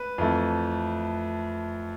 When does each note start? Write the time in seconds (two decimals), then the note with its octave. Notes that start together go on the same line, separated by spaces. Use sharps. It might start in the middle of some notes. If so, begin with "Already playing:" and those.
Already playing: B4
0.18 F2 E3 A3